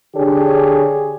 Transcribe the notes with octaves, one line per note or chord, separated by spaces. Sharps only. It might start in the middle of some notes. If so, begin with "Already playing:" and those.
D3 D4 G4 G#4 C#5